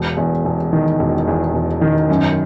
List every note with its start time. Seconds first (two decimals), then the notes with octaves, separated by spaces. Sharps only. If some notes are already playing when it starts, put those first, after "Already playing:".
Already playing: E1
0.17 E2
0.45 E1
0.73 D#3
0.99 E1
1.28 E2
1.54 E1
1.81 D#3
2.09 F#2